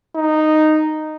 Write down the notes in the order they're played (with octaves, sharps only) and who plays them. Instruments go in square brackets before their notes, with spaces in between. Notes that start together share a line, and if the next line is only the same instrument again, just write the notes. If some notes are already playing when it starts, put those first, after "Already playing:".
[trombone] D#4